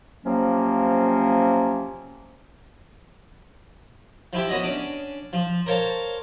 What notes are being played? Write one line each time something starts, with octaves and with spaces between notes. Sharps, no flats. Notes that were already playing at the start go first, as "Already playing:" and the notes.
C3 F3 F#3 A#3 C#4
F3 E4 G4
B3 C#4 F#4 D#5
C#4 D4
F3
A#4 C5 C#5 F5 A5